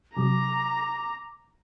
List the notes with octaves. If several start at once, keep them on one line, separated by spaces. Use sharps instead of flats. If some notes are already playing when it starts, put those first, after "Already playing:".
C3 F#3 A#5 D6